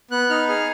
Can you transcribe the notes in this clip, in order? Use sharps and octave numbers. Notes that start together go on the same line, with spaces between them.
B3 F#6
D#4 F6
G#4 F6